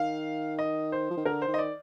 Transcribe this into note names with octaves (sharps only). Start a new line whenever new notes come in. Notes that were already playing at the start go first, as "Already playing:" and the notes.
Already playing: D#3 F5
D#5
C5
F3
D#3
D3 A#4
C5
D#3
D#5
D5